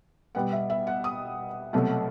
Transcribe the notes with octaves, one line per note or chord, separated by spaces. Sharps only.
B2 G3 B3 F#5
E5
E5
F#5
D#6
C2 B2 F#3 A3